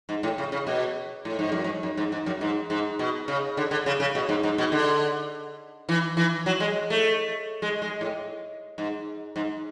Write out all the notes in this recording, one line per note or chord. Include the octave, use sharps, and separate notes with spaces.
G#2
A2
C#3
C#3
B2
A2
G#2
F#2
G#2
F#2
G#2
G#2
F#2
G#2
G#2
B2
C#3
D3
D3
C#3
C#3
B2
G#2
G#2
B2
D3
E3
E3
F#3
G#3
A3
G#3
G#3
A2
G#2
G#2